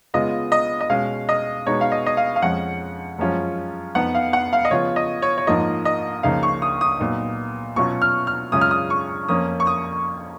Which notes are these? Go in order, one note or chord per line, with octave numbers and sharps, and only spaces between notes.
C#3 G#3 B3 F4 D#5
D#5
D#5
B2 G#3 C#4 F5
D#5
B2 G#3 B3 D#4 C#5
F5
D#5
D#5
F5
F5
F2 F3 G#3 C#4 F#5
F#2 F3 G#3 C#4 F4
F2 F3 B3 D#4 F#5
F5
F#5
F5
D#5
C#3 F3 B3 F4 C#5
D#5
C#5
C#5
G#2 F3 A#3 F4 D#5
D#5
C#2 C#3 F3 A#3 D#4 F5
C#6
D#6
D#6
A#2 F#3 B3 D#4
B2 F#3 C#4 F4 C#6
F6
F6
F#2 C#3 G#3 C#4 F4 D#6
F6
D#6
C#6
F2 F3 A#3 C#4 D#6
C#6
D#6